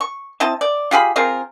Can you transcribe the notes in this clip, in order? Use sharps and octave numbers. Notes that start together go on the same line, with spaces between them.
C#6
C4 E4 D#5 A5
D5
F4 G4 G#4 B5
C4 F4 G#4 A#4